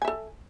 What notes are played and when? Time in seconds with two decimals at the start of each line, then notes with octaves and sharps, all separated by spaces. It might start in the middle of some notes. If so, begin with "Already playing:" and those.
0.02 G#5
0.05 E5
0.08 A4